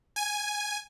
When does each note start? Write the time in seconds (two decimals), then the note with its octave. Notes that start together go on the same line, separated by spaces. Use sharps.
0.16 G#5